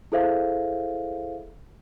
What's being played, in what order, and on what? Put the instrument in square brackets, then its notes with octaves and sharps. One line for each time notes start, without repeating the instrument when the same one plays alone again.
[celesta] E4 G#4 A4 C5 E5 F5